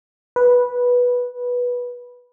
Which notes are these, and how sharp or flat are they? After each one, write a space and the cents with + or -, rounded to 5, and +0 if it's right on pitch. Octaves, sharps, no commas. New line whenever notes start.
B4 -15